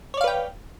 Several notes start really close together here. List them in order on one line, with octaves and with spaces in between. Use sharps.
C#5 D5 F5 B4 G5